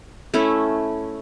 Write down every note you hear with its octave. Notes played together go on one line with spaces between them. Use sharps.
A3 C#4 E4